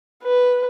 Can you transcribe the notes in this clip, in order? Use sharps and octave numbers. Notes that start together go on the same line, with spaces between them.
B4